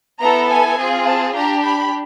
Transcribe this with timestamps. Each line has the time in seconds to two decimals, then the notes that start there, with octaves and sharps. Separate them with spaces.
0.20 B3 E4 A4 A#5
0.49 G#5
0.78 C4 F4 G#4
1.07 A5
1.35 D4 G4 A#5
1.64 B5